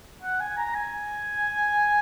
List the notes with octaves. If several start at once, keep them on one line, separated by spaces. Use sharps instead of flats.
F#5
G#5
A#5
G#5